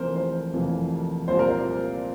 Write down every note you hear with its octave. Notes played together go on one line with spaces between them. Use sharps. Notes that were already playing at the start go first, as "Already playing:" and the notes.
Already playing: F1 F2 C3 E3 A#3 A#4 C5
C5
F1 F2 C3 E3 A#3
C2 A#2 G3 C4 C5
A#4
C5